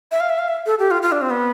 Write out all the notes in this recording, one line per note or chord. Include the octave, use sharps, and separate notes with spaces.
E5
F5
E5
F5
E5
A4
G4
F4
F4
D4
C4
B3